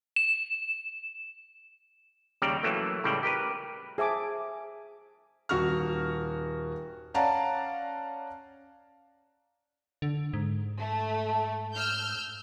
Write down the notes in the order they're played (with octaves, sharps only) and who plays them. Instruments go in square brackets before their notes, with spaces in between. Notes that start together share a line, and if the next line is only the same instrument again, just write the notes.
[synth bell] E7
[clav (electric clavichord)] D#2 C#3 G3 D5 G5 A#5
E3 F#3 A3 A#3
C#2 A2 C#3 G3 D5 G5
G4 A#4 B4
[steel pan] G#4 C5 E5 G#5 A5 D6
[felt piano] D#1 F#4 C#6 F6
C#4 D5 F5 F#5 A5 A#5
[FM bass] D3
G#2
[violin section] A3
E6 F6 G6